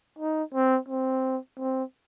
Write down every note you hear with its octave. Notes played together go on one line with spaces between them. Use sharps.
D#4
C4
C4
C4